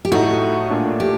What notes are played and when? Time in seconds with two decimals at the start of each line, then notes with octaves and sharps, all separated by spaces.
0.05 G4
0.11 A2 A3 D#4 F#4
0.70 A#2 A3 D4
1.00 G4